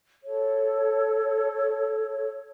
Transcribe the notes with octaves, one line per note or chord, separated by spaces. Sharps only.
A4 C#5